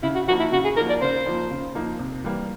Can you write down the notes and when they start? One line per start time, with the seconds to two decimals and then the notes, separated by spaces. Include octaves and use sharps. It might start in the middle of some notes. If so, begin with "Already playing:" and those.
0.03 C#3 E4
0.15 F#4
0.28 F3 A#3 D#4 F#4
0.39 E4
0.52 C#3 F#4
0.64 G#4
0.76 F3 A#3 D#4 A#4
0.89 D5
1.01 C#3 C5
1.26 F3 A#3 D#4
1.51 C#3
1.75 F3 A#3 D#4
1.99 C3
2.24 E3 G3 A#3